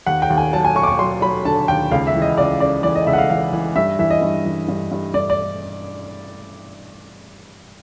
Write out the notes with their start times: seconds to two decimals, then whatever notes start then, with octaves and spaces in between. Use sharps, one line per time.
0.06 D#2 F#5
0.22 G5
0.30 D#2
0.38 G#5
0.53 F#3 A5
0.65 G#5
0.76 F#3 C#6
0.83 D6
0.87 C#6
0.99 F#3 C6
1.22 F#3 B5
1.45 D3 A5
1.68 D#2 G5
1.91 C#2 F5
2.07 E5
2.14 E3
2.22 D#5
2.38 C#2 D5
2.60 C#3 D5
2.83 E3 D5
2.95 D#5
3.06 C#2 E5
3.13 F#5
3.18 F5
3.29 E3 F5
3.53 E3
3.76 G2 E5
3.99 E3 E5
4.10 D#5
4.22 G2
4.45 E3
4.68 G2
4.91 G2
5.14 G2 D5
5.30 D5